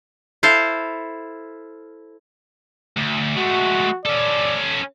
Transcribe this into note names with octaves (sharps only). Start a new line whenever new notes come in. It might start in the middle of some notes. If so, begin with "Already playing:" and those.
E4 A4 C5 F5
D2
G#3 A3 F#4
C#4 A4 D5